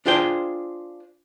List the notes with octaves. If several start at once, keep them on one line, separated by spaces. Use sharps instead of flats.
D4 F4 G#4 C5 G5